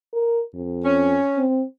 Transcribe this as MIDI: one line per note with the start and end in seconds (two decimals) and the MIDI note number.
0.13 0.42 70
0.54 1.19 41
0.85 1.44 61
1.38 1.63 60